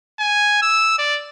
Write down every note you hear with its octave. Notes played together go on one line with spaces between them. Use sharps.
G#5
E6
D5